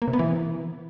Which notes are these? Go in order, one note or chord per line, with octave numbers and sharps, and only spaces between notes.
A#3
C3
B3
E3